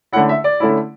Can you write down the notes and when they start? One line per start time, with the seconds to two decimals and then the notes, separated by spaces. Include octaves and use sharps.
0.12 D3 A3 C#4 E4 F#5
0.29 E5
0.44 D5
0.60 D3 A3 C#4 E4